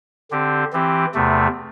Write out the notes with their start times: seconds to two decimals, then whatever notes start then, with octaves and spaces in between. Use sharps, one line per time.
0.31 D3 C4 G4
0.73 E3 C4 G4
1.14 E2 C3 A3